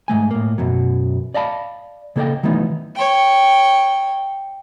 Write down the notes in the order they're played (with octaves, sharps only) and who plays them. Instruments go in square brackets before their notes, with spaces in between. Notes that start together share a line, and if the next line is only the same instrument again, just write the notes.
[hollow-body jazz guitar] G#2 D#3 A3 G#5
A2 A#3
F#2 B2 F#3
D5 D#5 F5 A5 B5
C#3 A#3 A4 C5 D#5 G5
D#3 E3 F#3 A3 B3 D#4
[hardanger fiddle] C#5 G5